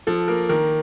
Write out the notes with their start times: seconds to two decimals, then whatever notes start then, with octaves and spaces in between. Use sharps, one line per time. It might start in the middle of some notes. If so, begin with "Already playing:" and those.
0.07 F3 A4
0.28 A#3 A#4
0.49 D#3 A#4